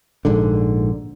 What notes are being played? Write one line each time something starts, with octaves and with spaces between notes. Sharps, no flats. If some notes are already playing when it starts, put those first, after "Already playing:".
A#1 G#2 D3